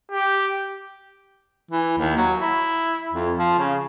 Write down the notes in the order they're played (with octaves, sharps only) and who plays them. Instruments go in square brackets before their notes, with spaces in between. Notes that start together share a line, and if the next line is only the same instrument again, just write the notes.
[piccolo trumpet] G4
[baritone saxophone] E3
D#2
F#3
E4
F2
F3
C#3